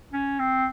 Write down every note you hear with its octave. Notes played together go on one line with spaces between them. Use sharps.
C#4
C4